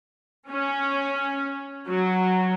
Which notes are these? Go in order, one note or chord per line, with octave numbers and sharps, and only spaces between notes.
C#4
F#3